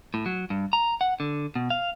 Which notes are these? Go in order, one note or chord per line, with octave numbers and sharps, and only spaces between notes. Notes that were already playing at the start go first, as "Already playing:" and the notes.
A2
F#3
G2
A#5
F#5
D3
B2
F5